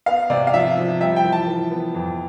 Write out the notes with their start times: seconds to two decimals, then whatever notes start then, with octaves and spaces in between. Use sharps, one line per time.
0.06 B3 F5
0.30 C3 D5
0.47 F5
0.53 F3 E5
0.78 F3
1.00 G3 E5
1.16 G5
1.24 E3
1.32 A5
1.47 E3
1.71 B3
1.95 F2